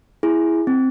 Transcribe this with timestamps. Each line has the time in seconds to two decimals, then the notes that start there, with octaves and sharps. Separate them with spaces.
0.23 E4 G#4
0.67 C4